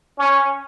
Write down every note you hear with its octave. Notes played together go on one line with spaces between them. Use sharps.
C#4